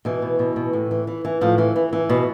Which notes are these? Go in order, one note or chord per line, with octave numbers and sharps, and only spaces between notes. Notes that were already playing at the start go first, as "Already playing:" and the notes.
B2 E3
B2
B2
B2
A2
E3
E3
E3
A2 F3
E3
E3
E3
B2